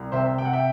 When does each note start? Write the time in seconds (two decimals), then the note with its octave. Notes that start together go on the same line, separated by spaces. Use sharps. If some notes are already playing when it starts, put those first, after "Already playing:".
Already playing: C2
0.12 C3 C5 E5
0.38 C3 G5
0.45 F#5
0.53 E5 G5